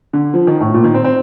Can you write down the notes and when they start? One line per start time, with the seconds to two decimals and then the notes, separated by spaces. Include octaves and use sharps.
0.13 D3
0.34 F3
0.47 D#3
0.60 A2
0.74 A#2
0.84 D#3
0.94 C4
1.04 C4